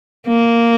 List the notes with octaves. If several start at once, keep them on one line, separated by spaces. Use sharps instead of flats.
A#3